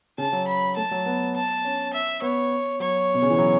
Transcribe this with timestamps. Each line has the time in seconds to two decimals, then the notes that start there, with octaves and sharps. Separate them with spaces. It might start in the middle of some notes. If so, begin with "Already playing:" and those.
0.18 C#3 A5
0.33 F#3
0.47 B5
0.77 A3 A5
0.91 F#3
1.06 B3
1.35 A5
1.65 C#4
1.93 E5
2.22 B3 C#5
2.80 F#3 C#5
3.14 B2
3.22 C#3
3.30 E3
3.38 F#3